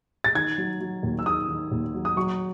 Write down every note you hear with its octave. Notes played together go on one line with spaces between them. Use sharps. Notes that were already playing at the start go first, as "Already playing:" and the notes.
A6
D#3 G#6
F#3
F#3
D#2
E6
D#3 D#6
D#3
D#2
F#3
D#6
F#3 C#6